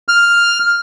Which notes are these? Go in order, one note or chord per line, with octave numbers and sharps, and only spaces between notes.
F6